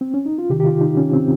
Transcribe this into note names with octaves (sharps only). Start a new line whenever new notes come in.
C4
C#4
D#4
F4
C3 D#3 G4
G4
F4
D#4
C#4
C4